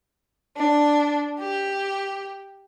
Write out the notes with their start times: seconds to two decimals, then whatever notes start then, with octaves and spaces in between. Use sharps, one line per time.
0.56 D4
1.39 G4